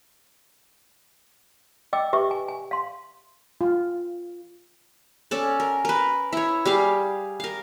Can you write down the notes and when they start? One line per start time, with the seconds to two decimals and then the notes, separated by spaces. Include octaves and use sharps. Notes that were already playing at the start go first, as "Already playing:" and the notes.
1.93 D#5 G5 D6 E6
2.13 G4 B4 E5 C#6 D6
2.31 G#5
2.48 G#5
2.71 F5 C6
3.61 F4
5.31 C#4 A4 D5
5.60 A#4
5.85 A#4 B4
6.33 E4 C#5
6.66 G3 G#4 F5
7.40 A#4 F5